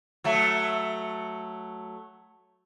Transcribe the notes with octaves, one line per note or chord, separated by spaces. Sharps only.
F#3 A3